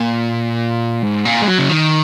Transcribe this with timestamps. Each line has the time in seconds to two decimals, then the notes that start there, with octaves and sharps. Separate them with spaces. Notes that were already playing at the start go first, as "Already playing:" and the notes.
Already playing: A#2
1.03 G#2
1.25 A#2
1.42 G#3
1.48 F#3
1.58 C#3
1.70 D#3